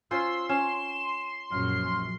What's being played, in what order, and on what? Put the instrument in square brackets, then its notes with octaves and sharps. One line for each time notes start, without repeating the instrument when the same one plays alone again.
[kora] C#4 F4 C5 [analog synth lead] C6 [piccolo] E6
[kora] C#4 [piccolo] E7
[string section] A#1 F#2 [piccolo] F6